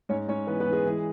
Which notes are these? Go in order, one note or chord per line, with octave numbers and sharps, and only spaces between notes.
G#2 C#4 C#5
G#2 C#4 C#5
E3 B3 B4
B3 B4
E3
G#3 G#4
E3